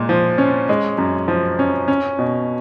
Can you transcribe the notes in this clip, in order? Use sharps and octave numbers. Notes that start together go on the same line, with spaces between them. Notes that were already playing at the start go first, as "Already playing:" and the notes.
Already playing: A#2 G#3
F3
C#4
G#3
F#2
F3
C#4
C#4
B2